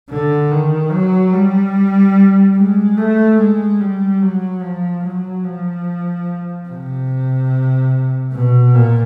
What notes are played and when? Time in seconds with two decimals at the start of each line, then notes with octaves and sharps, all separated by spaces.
0.10 D3
0.51 D#3
0.91 F#3
1.33 G3
2.56 G#3
2.97 A3
3.39 G#3
3.80 G3
4.22 F#3
4.62 F3
5.04 F#3
5.44 F3
6.69 C3
8.33 B2
8.74 A#2